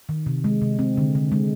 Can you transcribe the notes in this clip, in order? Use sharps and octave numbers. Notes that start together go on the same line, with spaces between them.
D#3
C3
G#3
C3
C4
D3
D3
G#3